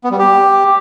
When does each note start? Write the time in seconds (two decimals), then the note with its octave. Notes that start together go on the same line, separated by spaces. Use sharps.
0.04 B3
0.11 G3
0.19 G4